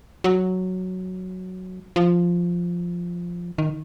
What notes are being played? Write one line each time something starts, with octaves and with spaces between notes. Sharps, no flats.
F#3
F3
D#3